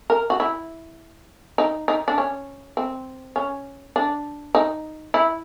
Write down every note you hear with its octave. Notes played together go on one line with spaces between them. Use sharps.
A#4
F#4
E4
D#4
D#4
D4
C#4
C4
C#4
D4
D#4
E4